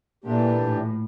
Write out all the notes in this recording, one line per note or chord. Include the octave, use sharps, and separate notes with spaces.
A#2 E3 A3 D4 G4
A2